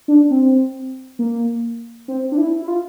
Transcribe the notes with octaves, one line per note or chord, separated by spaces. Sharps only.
D4
C4
A#3
C4
D4
E4
E4
F4